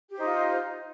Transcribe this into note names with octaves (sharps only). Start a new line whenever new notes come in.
D#4 F4 G4 C5